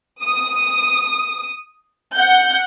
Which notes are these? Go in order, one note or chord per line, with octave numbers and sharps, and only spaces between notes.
D#6
F#5 G6